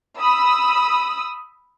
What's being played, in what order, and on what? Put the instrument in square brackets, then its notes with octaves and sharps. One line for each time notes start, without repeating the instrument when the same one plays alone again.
[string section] B5 D#6 E6